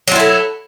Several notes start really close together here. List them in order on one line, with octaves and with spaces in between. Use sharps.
F#3 F4 E4 A3